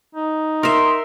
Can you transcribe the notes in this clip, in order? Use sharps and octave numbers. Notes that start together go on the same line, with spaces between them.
D#4
A#4 E5 C6